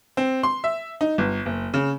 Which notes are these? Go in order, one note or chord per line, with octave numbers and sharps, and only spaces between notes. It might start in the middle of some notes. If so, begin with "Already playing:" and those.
C4
C6
E5
D#4
G1
F#1
C#3